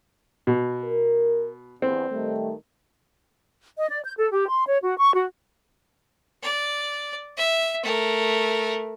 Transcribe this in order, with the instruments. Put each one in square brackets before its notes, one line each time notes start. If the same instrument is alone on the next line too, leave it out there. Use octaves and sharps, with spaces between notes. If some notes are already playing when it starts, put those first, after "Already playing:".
[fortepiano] B2
[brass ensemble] A#4
[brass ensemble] E2 G2 [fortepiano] C4
[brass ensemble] D#3 G3 A3
[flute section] D#5
D5
G6
A4
G4
C6
C#5
F#4
C#6
F#4
[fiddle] D5
E5
A3 A#4